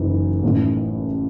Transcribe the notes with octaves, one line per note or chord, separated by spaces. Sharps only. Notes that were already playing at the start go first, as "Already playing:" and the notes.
Already playing: F#1 F#2 E3 D#4
A1 A2 E3